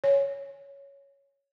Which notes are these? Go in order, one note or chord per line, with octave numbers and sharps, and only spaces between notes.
C#5